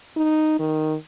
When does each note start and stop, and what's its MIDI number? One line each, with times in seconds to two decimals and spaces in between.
0.16 0.55 63
0.60 0.95 51